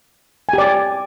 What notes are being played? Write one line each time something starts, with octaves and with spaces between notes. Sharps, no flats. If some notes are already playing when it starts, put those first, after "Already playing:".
G4 D5 G#5